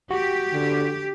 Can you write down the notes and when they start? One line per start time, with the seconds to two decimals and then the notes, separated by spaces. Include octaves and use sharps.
0.11 F#4 G4
0.53 D3